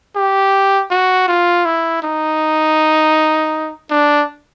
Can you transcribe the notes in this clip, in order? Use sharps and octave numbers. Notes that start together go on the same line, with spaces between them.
G4
F#4
F4
E4
D#4
D4